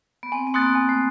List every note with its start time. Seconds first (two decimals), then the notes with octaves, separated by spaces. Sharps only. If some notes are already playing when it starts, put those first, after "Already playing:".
0.23 B3
0.32 C4 G#5
0.47 C4
0.54 A#3 C6 D#6 F#6 A6
0.62 B3
0.75 G#5
0.89 A3